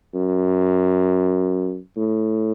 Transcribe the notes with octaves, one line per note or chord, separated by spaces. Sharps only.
F#2
A2